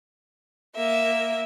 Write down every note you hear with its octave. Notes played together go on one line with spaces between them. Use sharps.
A#3 E5